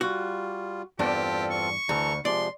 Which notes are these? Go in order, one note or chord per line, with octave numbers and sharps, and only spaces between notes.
G3 F4 F#4
E2 G2 C4 D4 F4 G4 A4
C#6
D2 E3 A4 A#5
C3 F3 G#3 D5 C6